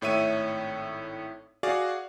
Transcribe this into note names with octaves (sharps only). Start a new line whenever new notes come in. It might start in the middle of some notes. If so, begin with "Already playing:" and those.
G#1 A2 C#5 E5 D#7
F#4 G#4 D5 F5 F#5